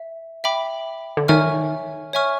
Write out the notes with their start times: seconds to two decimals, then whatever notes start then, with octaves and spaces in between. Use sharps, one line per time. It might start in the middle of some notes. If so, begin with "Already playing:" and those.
Already playing: E5
0.44 E5 G5 B5 D6
1.17 D3
1.28 D#3 C#5 E5 G#5 C#6 F6
2.13 C#5 E5 G#5 C#6 F6